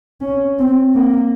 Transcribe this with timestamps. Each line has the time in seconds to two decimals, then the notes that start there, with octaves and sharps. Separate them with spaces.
0.21 C#4
0.58 C4
0.94 A#3